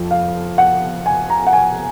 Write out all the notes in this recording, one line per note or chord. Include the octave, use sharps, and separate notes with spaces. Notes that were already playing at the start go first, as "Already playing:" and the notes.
Already playing: F2 F3
F5
F#5
G#5
A#5
F#5
G#5